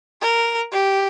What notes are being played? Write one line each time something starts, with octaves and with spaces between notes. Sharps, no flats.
A#4
G4